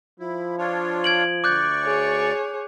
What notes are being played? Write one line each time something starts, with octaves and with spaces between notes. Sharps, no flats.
F3 E4
D4 F4 C#5
G#6 D7 F#7
D2 D5 C#6 D6 F#6 G6
G#4 C#5